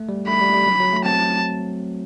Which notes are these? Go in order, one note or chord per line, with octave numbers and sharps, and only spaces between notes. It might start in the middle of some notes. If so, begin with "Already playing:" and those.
Already playing: A3
G3
A3 B5
G3
G3
F#3
F#3
A3
C4 A5